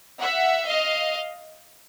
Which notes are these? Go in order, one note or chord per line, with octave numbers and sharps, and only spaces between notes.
E5 F#5
D#5 F5